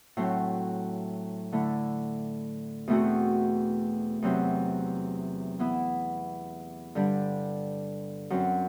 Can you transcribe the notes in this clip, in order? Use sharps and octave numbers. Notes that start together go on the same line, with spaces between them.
A2 F#3 C4
D3 A3 E4
E2 B2 A3 C4 F#4
E2 C3 F#3 C4
E3 B3 E4
G2 D3 G3 D4
F#2 F#3 C4